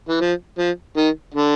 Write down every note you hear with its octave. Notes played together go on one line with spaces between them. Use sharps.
E3
F3
F3
D#3
D3